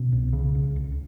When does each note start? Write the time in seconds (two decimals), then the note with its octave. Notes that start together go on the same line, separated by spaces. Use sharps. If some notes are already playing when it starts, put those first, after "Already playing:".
Already playing: B2 C#4
0.12 C2
0.33 C#3
0.55 C#2
0.76 C#2